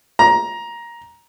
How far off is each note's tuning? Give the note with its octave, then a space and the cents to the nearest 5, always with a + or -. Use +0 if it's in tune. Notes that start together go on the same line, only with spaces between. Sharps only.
A#5 +15